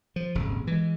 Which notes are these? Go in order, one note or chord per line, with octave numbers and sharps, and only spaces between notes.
F3
D#1 G#1 C#3
E3 G#3